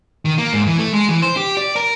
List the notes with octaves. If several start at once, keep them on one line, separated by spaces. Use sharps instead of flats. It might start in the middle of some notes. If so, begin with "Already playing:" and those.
D#3
A#3
G#2
E3
A3
G#3
E3
C5
G4
D5
A#4